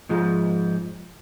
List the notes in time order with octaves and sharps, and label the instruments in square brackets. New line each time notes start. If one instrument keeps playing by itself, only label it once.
[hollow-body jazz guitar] G#2 F3 G#3